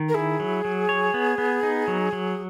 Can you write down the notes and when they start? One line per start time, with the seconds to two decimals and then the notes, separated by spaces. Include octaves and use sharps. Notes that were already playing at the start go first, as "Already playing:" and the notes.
Already playing: D#3
0.09 A#4
0.14 E4 G#4
0.40 F#3
0.65 F#3
0.89 C#5
1.14 B3
1.38 B3
1.63 D#4
1.88 F#3
2.13 F#3